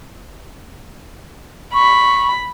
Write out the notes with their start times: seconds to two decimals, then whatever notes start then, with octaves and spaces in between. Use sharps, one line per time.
1.74 B5 C#6